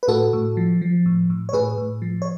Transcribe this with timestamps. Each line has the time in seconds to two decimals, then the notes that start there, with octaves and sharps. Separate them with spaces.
0.03 B4
0.08 A2 F#4 A4
0.33 A2
0.57 F3
0.81 F3
1.06 A2
1.30 A2
1.49 C#5
1.53 A2 G#4 B4
1.78 A2
2.02 F3
2.22 C#5